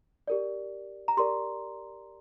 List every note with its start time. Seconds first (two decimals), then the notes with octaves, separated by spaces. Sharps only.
0.28 G4 A#4 D5
1.08 A#5
1.17 G4 A#4 D5 C6